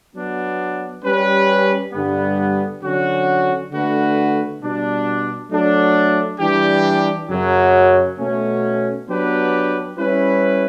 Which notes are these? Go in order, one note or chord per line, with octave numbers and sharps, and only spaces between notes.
F#3 B3 D4
G3 C#4 G4 B4
G2 D3 G3 B3
D3 F#3 C#4 F#4
D3 A3 D4 F#4 B4
B2 G3 D4
F#3 A3 D4 A4
E3 G3 D4 G4
F#2 C#3 F#3
B2 A3 C#4
F#3 B3 D4 G4 B4
G3 C#4 E4 B4